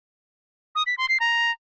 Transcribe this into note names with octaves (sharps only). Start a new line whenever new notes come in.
D#6
B6
C6
C7
A#5